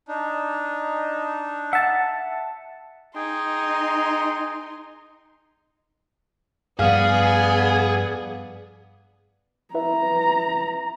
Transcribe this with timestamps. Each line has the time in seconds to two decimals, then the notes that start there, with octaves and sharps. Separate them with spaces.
0.08 D4 D#4
1.73 E5 F#5 A5
3.16 D#4 G#4 G5 C6
6.79 G2 F3 B3 G#4 D5 F5 F6
9.74 E4 B4 E5 A#5